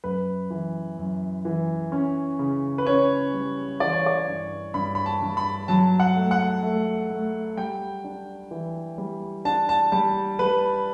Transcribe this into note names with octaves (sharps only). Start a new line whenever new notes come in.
F#2 B4
E3
F#2
E3
C#4
C#3
B4
C#4 C#5
G3
E3 D5
C#5
D5
G2
G2 B5
B5
A5
G2
B5
F#3 A5
F#5
A3
F#5
A3
A3
G3 G5
D4
E3
G3
D4 A5
A5
G3 A5
G3 B4